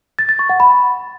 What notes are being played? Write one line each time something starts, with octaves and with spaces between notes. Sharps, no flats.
A6
A6
C#6
F#5
B5